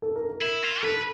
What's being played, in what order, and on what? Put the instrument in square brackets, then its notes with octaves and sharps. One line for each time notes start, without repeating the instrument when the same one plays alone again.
[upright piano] A4
A#4
A#4
[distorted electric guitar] E4
F4
[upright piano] A4 [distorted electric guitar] B4